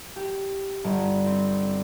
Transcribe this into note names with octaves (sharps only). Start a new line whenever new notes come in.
G4
G1
C4